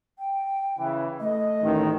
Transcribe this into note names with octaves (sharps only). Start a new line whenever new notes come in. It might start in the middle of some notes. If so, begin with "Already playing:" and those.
G5
C#3 E3
A3 D#5
A1 D#3